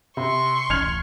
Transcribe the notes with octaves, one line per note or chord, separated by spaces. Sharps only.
C3 C6 C#6
D1 A1 F6 G#6 F7